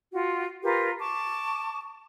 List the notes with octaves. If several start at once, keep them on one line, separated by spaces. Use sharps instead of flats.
F4 F#4
F4 G4 A#4 B4
A5 C#6 D6